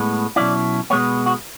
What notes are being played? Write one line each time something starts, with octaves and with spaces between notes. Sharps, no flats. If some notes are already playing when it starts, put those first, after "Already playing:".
Already playing: A2 G#3 B3
B2 F#3 C#4 E4 D5
B2 G#3 B3 C#5
F#4